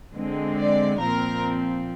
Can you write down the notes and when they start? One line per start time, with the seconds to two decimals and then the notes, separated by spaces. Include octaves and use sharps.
0.13 D3 G#3 C4
0.56 D5
1.00 A#2 F3 C4 A#4